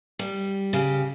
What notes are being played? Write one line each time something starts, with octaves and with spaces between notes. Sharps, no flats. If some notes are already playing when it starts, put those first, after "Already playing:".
G3
C#3 G4